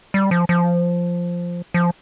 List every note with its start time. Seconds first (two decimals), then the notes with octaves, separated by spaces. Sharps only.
0.14 G3
0.31 F3
0.49 F3
1.74 F3